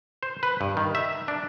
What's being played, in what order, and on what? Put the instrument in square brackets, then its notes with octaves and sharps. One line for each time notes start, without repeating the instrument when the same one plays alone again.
[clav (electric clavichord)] C5
B4
G2
D#3
E5
D4